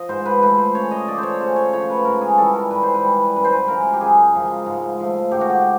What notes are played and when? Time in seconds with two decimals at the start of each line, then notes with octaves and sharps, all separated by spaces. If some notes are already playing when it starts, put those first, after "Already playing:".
Already playing: F3 D#5
0.09 G#2 C5
0.26 B4
0.42 F3 A3 B4
0.58 C5
0.75 C#3 C#5
0.91 D#5
1.07 F3 A3 D5
1.18 C5
1.23 C#5
1.40 C#3 C5
1.56 C#5
1.73 F3 A3 C#5
1.89 B4
2.05 G#2 A#4
2.21 G#4
2.38 E3 G3 A4
2.54 A#4
2.71 G#2 B4
2.83 C5
2.94 B4
3.03 E3 G3
3.36 F#2 B4
3.44 C5
3.53 B4
3.68 C#3 F3 G#3 A#4
3.93 G4
4.01 F#2 G#4
4.33 C#3 F3 G#3
4.66 G#2
5.00 F3 A3
5.32 G#2 G4
5.41 F#4
5.50 G4